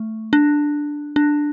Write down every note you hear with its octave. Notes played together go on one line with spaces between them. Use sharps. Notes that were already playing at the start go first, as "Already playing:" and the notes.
Already playing: A3
D4
D4